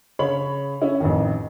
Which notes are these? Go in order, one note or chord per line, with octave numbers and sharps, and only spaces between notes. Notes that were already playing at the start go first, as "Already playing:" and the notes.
C#3 C#5 B5 F#7
C#4 E4
A1 F2 D#3